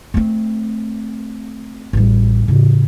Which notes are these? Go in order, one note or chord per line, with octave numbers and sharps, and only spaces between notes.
A3 C4
A1 G3
A2 C#3